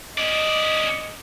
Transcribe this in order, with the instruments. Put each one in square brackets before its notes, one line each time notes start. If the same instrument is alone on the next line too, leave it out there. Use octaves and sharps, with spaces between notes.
[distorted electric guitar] C#4 D5 [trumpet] D#5